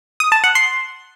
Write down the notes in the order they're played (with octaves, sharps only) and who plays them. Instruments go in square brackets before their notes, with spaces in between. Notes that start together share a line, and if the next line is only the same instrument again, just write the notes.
[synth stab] D#6
A5
F#5
C6